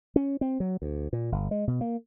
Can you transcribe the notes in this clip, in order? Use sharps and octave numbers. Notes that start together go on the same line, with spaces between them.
C#4
C4
F#3
D2
A#2
G1
G#3
B2
A#3